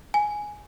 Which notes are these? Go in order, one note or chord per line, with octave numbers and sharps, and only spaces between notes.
G#5